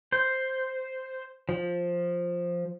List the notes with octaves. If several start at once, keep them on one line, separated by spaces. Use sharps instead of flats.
C5
F3